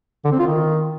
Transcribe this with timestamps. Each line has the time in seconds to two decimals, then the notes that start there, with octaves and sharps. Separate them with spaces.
0.25 D3
0.32 C4
0.39 F4
0.47 D#3